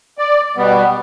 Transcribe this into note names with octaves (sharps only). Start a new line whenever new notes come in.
D5
B2 G3 B3